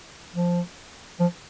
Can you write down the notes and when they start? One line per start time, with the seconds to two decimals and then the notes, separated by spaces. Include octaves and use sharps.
0.35 F3
1.19 F3